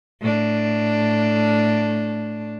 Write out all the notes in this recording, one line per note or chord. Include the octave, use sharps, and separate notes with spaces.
A2 D4